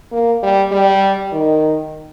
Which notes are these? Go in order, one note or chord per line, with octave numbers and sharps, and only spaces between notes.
A#3
G3
G3
D#3